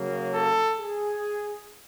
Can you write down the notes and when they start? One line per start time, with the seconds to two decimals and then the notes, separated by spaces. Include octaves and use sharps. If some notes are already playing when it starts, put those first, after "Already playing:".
Already playing: C#3 F#3 A#3
0.34 A4
0.78 G#4